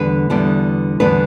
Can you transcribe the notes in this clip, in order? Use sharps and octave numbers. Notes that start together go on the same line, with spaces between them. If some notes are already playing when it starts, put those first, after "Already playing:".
Already playing: E2 D3 G3 B3 B4
E2 D3 G3 B3
E2 D3 G3 B3 B4